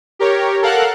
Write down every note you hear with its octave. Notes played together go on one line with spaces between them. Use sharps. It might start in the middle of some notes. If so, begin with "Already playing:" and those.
G4 A#4 C#5
A4 A#4 F5 F#5 F#6